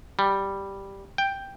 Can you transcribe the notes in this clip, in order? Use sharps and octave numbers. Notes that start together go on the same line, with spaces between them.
G3
G5